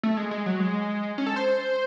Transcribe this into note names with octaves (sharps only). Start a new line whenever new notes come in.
A3
G#3
G#3
F#3
G#3
C#4
A4
C5